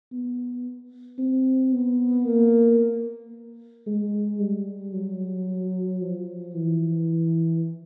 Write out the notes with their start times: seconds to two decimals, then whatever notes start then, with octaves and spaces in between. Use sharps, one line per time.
0.12 B3
1.19 C4
1.73 B3
2.26 A#3
3.87 G#3
4.40 G3
4.94 F#3
6.02 F3
6.55 E3